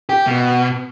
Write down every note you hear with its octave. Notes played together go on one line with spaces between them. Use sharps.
G4
B2